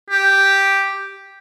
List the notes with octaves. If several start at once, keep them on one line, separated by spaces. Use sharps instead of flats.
G4